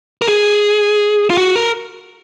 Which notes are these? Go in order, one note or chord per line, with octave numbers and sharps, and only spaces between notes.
A#4
G#4
F4
F#4
A#4